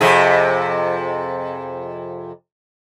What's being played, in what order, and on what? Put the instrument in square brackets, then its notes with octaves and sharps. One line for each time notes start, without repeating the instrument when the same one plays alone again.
[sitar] F2 C3 G#4